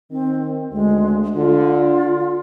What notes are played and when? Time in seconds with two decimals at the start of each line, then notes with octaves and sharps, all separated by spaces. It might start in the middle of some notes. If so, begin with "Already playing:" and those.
0.11 D#3 C4
0.72 D2 G#3
1.36 D3 F4